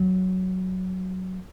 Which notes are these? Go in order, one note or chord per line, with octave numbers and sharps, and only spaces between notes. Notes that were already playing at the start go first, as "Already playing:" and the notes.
Already playing: F#3